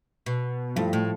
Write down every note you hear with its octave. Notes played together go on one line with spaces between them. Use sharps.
B2
G2 F3 A3 E4
A2